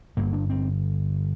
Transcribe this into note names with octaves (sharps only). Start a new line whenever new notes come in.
G1 G2 D3 A#3
D4
C4